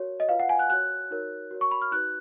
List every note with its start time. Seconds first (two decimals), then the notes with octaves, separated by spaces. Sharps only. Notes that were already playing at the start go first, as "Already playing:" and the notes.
Already playing: F#4 A#4 C#5
0.20 D#5
0.29 F4 B4 F5
0.39 F#5
0.49 G#5
0.59 F#6
0.70 F#4 C#5 F#6
1.10 D#4 F#4 A#4 C#5
1.51 F#4 A#4 C#5
1.61 C#6
1.71 B5
1.82 F6
1.91 D#4 F#4 B4 F#6